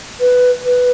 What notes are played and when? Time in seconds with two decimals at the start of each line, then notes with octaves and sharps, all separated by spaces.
0.20 B4
0.65 B4